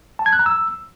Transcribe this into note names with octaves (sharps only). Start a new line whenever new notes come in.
A5
G#6
F#6
A#5
E6